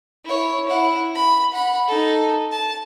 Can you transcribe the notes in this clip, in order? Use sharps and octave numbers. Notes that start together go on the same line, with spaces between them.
E4 C#5
E4 F#5
B5
F#5 B5
D#4 A4
A5